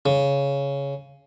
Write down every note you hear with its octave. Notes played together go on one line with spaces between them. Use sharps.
C#3